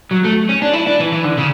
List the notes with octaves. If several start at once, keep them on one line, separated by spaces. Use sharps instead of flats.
F#3
A3
C#4
D4
E4
D4
E3
E3
D3
C#3